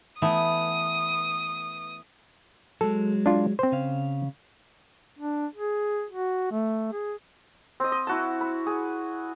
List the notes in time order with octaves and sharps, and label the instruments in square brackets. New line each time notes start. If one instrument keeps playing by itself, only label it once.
[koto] E3 A3 B3 [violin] D#6
[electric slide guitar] F#3 G#3 [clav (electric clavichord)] A4
[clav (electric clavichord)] D4 F4
C4 C5
[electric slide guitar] C#3 F5
[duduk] D4
G#4
F#4
A3
G#4
[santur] C4 D#5
D#5
E4 F#4 A5
B5
G#4